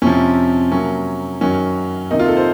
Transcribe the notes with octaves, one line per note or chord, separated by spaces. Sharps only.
F2 C3 F3 C#4
C3 F#3 A#3 C#4
F#2 D#3 F#3 C#4
C3 D#3 A#3 D#4
F4
A4
C5